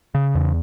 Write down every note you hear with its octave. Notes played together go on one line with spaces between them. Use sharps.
C#3
E2